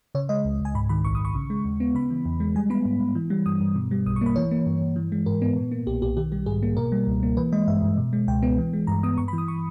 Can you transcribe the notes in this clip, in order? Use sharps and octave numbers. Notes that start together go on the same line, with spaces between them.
C#3 C#5
G#3 D#5
C#2
C#2
G#5
G#2 B5
D#3 B5
A#1 C#6
D#6
A#1
C#6
C#3
G#3
D#2
B3
C#3 B5
E3
E2
G#3
G3 G#5
B3 B5
G#2
G#2
E3
G3
G2 D#6
G2
B2
G3
B1 D#6
C#6
A#3 B5
E3 C#5
A#3
G2
G2
E3
G#3
G#2 A#4
B3
A#2
A#3
B1 G4
B1 G4
D#3 G4
G3 G4
G#2 G#4
A#3
B2 A#4
G3
C#2
A#3
E3 B4
G#3 D#5
G2 E5
G2
B2
G#3
C#2 G5
B3
E3
G#3
G2 A#5
B3 D#6
G2 C#6
B5
E3
D#6
C#6